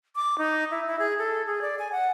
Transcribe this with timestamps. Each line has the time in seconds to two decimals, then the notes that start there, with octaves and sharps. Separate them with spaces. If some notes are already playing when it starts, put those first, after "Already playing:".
0.16 D6
0.38 D#4
0.71 E4
0.87 E4
0.99 G#4
1.18 A4
1.47 G#4
1.62 D5
1.79 G#5
1.92 F#5